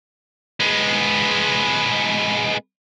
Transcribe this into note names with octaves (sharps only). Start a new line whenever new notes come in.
G#3 B3